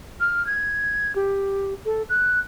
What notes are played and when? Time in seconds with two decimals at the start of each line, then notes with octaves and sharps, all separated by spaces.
0.20 F6
0.46 G#6
1.15 G4
1.85 A4
2.09 F#6